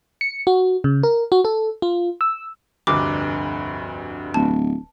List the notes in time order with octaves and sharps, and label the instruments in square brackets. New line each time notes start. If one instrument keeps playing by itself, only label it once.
[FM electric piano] C#7
F#4
C#3
A#4
F#4
A4
F4
E6
[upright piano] F1 D2 G2 [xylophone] D6
[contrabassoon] D1 [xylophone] A5